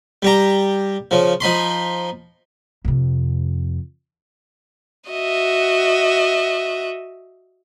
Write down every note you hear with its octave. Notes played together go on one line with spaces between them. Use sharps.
G3 G4 A#5
C#3 F3
F3 D#4 B5 C6
F2 C3
F#4 D#5 E5